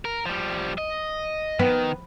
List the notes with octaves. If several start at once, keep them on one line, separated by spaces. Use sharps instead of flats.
A#4
F3 G3
D#5
D#3 B3